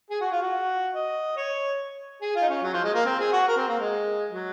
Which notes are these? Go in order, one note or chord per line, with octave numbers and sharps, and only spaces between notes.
G#4
F#4
F4
F#4
D#5
C#5
G#4
F4
D#4
C#4
F#3
F3
G#3
A#3
C4
G#4
F#4
A#4
C4
A#3
G#3
F#3